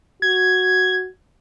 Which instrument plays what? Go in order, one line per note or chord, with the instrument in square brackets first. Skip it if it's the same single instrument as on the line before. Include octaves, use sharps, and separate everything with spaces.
[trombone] F#4 [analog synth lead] G#6